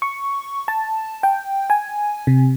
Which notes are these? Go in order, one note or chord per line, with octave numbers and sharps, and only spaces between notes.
C#6
A5
G5
G#5
C3